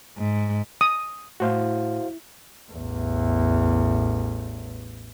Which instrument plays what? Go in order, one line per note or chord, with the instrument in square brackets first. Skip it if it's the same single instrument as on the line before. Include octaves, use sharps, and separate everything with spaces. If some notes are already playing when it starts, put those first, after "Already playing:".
[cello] G#2
[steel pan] D#6
[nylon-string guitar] A2 [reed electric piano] F#4 C5 F5
[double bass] A1 E2